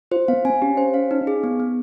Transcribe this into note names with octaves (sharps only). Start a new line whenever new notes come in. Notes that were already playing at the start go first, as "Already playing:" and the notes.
F4 C5
B3 F5
C4 G#5
C#4 G4
C5
F5
D#4
G#4
B3
B3